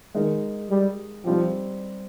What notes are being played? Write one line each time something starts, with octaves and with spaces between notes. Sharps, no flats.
D#3 G#3 D#4 A#4
G3
F3 G3 C4 D#4 G4